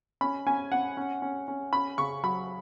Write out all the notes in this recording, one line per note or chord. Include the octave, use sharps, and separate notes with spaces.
C#4 B5
C#4 G#5
C#4 F#5
C#4
C#4
C#4
C#4 B5
C#3 C#6
F#3 B5